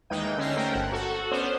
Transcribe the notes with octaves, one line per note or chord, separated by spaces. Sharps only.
D#2 E3 G#3 D#4 G5 D#7
D3 C#4 E6 A#6 C7
A3 C#4 A#4 C5 G5
G1 F#5
F#4 A4
B3 C#4 D4 C5